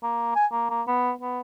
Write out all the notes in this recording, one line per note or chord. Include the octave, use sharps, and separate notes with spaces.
A#3
G#5
A#3
A#3
B3
B3